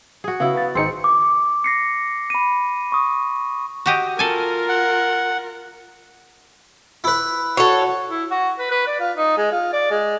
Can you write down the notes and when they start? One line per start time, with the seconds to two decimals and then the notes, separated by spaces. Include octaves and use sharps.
0.24 F#4 G#4
0.40 C#3 B3 E4 F#4 F5
0.54 B4 B5 A6
0.75 G#1 C4 D#4 G#4 C6 C#7
1.04 D6
1.64 A#6 C7 C#7
2.30 B5 D#7
2.92 C#6 D#6
3.86 F#4 G4 D#5
4.19 F4 A4 A#4 G#5
4.69 F#5
7.04 E4 B4
7.57 F#4 A4 C#5
8.10 E4
8.31 F#4
8.59 B4
8.71 B4
8.87 D5
9.00 F4
9.17 D#4
9.37 G#3
9.52 F4
9.73 D5
9.91 G#3